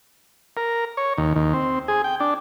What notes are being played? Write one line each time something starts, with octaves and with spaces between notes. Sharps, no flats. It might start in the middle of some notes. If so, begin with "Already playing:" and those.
A#4
C#5
D#2
D#2
C4
G#4
G5
D4